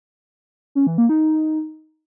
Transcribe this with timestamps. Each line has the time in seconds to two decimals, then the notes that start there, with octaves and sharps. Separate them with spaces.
0.75 C#4
0.87 E3
0.98 A#3
1.09 D#4